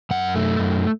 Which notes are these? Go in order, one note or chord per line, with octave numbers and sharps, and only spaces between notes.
F#2 F#5
A3
F#2